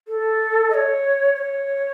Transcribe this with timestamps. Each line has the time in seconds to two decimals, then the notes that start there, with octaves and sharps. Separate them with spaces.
0.08 A4
0.70 D#5
0.74 C#5
1.35 C#5